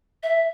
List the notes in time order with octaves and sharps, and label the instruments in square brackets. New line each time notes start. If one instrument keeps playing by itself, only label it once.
[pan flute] E5